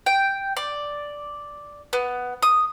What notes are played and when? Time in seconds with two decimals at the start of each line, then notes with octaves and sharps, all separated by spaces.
0.06 G5
0.57 D5
1.93 B3
2.42 D#6